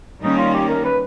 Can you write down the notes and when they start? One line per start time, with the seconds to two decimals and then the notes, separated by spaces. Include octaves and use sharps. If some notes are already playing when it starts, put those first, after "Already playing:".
0.22 D#3 G3 A#3 C#4 D#4
0.38 F4
0.54 G4
0.69 A#4
0.84 B4